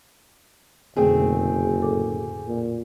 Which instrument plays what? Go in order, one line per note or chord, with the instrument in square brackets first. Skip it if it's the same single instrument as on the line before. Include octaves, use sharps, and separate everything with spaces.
[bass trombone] F#1 [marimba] F2 B2 D3 [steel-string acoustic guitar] A3 C4 G#4
[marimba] A2 A4 D6
[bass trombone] A#2